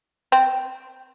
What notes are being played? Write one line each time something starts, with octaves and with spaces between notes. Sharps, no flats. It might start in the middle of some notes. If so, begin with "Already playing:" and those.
C4